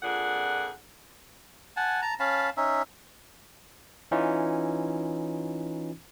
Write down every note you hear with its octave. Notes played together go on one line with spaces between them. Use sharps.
F2 A#2 D4 G#4 F#5
F#5 G#5 A5
A5 A#5
C#4 F5 A5 B5
C#4 D#4 E5
E3 C#4 D#4 F4